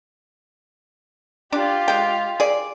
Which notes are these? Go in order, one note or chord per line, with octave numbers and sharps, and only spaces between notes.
D4 F4 G4 D5
G#3 G5
G#4 D5